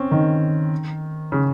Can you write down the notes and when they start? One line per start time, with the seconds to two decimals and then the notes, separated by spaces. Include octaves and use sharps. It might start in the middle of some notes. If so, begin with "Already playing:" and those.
Already playing: C4 C#4
0.11 D#3
1.32 C#3